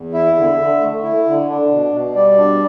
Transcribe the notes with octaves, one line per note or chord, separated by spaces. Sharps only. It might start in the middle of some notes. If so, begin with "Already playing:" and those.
Already playing: E2
E4 E5
D3
D3
A3
E4
D3
D4
B2
B2
G3 D5
D4